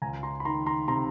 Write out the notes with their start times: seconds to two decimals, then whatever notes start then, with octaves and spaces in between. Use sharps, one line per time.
0.02 C#2 G#5 A#5
0.23 A#5 C6
0.40 B5
0.45 D#3 A#5 C6
0.66 A#5 C6
0.88 C3 A#5 C6